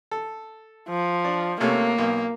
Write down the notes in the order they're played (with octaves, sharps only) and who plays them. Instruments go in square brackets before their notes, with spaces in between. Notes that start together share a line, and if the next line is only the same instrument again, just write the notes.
[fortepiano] A4
[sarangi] F3
[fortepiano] D4
[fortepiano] C3 A3 C#4 [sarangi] A#3
[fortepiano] B1